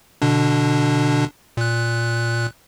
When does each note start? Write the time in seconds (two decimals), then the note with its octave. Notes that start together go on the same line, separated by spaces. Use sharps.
0.22 B2 D3 D4
1.57 A#2 F#6